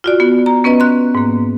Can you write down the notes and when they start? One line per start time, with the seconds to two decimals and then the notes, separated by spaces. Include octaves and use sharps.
0.04 F4 F#4 D5
0.20 B3 F#4
0.46 A#5
0.64 B3 C#4 B4 D#5
0.80 C6 F#6
1.15 G#2 A#3